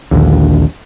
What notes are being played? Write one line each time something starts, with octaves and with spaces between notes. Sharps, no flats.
A#1 D#2 D3